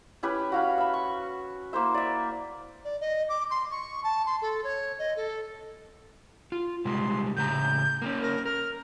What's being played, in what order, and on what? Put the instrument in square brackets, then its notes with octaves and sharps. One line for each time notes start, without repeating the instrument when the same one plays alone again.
[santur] C#4 E4 G4 B4
F#4 F5 B5
E5 B5
C#6
A#3 E4 C5 E5
D5 E5
[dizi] D5
D#5
D6
C6
C#6
A5
C6
A4
C#5
D#5
A4
[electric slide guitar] F4
[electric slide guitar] C3 G3 G#3 [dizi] C6
[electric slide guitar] A2 C#3 A#5 [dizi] G6
[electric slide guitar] A#3 C4 C#4
[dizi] A#4
[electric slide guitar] A#4 [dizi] F6